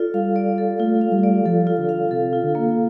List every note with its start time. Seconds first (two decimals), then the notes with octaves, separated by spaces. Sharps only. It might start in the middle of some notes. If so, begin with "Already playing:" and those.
Already playing: F4 A4 D5
0.14 G3 F5
0.36 D5
0.58 A4
0.80 A3 F4
1.01 F5
1.12 G3
1.24 D5
1.46 F3 A4
1.67 F4
1.78 D3
1.89 F5
2.10 C3 A4
2.33 F4
2.43 D3
2.55 A#3